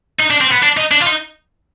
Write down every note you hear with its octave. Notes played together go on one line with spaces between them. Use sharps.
D#4
D4
C4
B3
D4
D#4
D4
F4
D#4